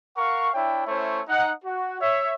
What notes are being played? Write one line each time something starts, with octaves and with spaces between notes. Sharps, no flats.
A#4 F5 F#5 C#6
D4 E4 C#5 E5 G5
A3 C#4 E4 C5 C#5 E5
D#4 F#5
F#4
C#5 E5